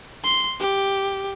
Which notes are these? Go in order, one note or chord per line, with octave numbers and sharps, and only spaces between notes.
C6
G4